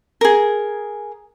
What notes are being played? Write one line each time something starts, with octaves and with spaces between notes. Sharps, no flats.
G#4 A#4